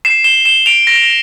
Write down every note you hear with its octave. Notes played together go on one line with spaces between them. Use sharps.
C7 E7
E7 G7
E7 G7
D7 F7
A#6 D7